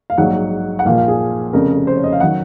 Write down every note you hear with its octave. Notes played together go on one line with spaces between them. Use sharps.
F5
A#1 G#2 F#3 F#5
F#5
A#1 A#2 F3 F5
F5
G#4
F1 F2 C#3 A#4
C5
C#5
D#5
F5
D#3 F#3 F#5